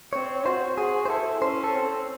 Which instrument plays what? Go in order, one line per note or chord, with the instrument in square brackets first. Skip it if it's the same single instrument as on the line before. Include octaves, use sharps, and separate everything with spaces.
[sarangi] C4 [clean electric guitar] C#5
[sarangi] F#4 [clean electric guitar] C5
[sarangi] F#4 [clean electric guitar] G#4
[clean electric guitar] C5
[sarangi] E4 [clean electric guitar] A4
[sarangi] C#4 [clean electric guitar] C5
[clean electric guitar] A4
[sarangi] C4